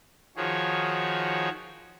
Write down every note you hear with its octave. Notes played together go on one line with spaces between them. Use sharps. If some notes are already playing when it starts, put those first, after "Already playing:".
D#3 F3 F#4 G#4 C#5